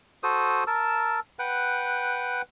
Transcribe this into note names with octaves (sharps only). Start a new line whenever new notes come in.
F#4 A4 C5 D#6
A#4 A5 E6
B4 F#5 G5